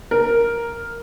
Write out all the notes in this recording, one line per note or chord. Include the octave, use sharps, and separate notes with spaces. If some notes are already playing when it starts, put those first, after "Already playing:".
A#4